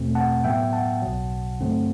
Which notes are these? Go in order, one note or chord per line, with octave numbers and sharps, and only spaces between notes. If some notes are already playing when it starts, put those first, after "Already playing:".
Already playing: E2 B2 A3 C4
F#5 A5
A2 F#3 B3 E5 G5
F#5 A5
B1 B2 F#3
G2 D3 F#3 A3 C4